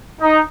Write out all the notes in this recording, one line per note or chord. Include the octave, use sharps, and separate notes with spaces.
D#4